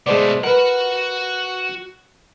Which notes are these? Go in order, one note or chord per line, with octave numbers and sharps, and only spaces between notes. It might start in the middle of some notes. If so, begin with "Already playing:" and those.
B2 G#3 A3 C5 D5
F#4 A#4 B4 F#5